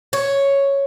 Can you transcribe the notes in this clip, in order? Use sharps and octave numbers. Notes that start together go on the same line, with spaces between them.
C#5